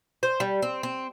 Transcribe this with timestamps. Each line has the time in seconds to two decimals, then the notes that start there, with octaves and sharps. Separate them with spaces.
0.23 C5
0.40 G3
0.62 C4
0.83 C4